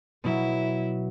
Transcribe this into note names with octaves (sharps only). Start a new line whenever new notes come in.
B2 F#3 E4